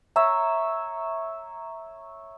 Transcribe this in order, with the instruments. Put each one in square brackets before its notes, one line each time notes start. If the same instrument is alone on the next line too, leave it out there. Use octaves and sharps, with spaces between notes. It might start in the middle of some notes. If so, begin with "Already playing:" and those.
[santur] C#5 E5 A#5